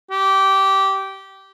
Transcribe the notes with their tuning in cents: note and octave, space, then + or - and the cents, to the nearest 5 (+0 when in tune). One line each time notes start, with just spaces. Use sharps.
G4 -15